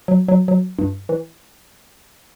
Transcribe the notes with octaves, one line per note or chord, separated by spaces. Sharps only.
F#3
F#3
F#3
G2
E3